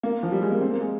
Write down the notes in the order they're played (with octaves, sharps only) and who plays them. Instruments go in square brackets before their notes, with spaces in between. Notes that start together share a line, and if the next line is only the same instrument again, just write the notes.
[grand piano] A#3
F3
G3
G#3
A#3
C4
A#3
G#3